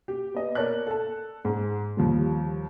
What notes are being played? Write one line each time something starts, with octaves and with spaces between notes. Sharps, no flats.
G4
B3 D#5
A#4 C#5 D5 A5 F#6
A4 A5
G#2
D#2 F3 G3